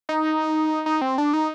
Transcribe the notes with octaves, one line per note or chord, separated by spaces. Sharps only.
D#4
D#4
C4
D4
D#4